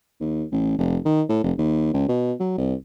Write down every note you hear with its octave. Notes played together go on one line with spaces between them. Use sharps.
D#2
A1
F1
D#3
A2
F1
D#2
C#2
B2
F#3
C2